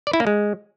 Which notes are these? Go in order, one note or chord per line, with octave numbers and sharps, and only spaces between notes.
D5
E4
A#3
G#3